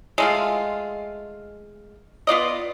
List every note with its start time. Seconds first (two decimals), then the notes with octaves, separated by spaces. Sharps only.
0.18 G#3 A3 F4
2.27 B3 F4 D5 D#5